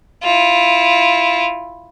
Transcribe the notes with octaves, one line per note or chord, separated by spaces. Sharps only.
E4 F4